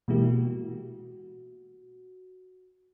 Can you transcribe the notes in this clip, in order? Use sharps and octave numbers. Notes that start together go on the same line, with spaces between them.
B2 E3 G#3 A#3 E4 G4
F#4